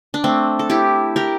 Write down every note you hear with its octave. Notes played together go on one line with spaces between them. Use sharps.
D4
A3 C4
A4
E4 G4
G4 A#4